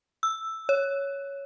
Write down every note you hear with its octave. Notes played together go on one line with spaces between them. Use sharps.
E6
C#5